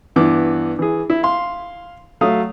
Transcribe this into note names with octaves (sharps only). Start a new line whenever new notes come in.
G2 E3 B3 D6
E3 G#4
E4
F5 C6
F#3 A3 F5 D#6